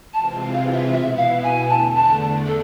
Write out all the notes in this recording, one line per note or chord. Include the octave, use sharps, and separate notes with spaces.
C3 E3 G#3 C4 F4 A5
F5
E5
B2 B3 E4 E5
F5
G#5
E2 D3 A3 D4 A5
A5
A4